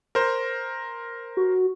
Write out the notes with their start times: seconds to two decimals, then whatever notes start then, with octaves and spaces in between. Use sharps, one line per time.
0.15 A#4 C5
1.37 F#4